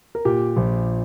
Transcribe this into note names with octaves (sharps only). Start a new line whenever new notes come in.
A#4
A#2 G4
A#1